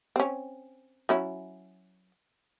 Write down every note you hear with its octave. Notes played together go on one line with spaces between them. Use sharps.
C4 C#4
F#3 C#4 E4